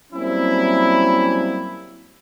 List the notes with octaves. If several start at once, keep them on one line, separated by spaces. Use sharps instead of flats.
F#3 G3 A#3 C4 C#4 E4